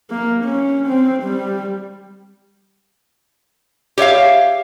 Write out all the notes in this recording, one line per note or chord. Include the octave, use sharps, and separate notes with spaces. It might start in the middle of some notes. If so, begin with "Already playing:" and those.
A#3
C#4
C4
G3
G4 C#5 E5 F5